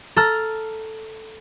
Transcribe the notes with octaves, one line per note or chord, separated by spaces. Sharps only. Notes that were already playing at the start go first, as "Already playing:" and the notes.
A4 A#5 F6